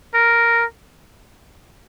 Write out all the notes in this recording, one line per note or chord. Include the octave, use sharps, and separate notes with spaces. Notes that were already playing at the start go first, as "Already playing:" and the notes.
A#4